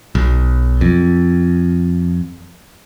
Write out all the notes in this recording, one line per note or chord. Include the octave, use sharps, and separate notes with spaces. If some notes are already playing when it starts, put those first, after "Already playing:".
B1
F2